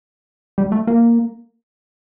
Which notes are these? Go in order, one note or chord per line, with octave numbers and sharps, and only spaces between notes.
G3
A3
A#3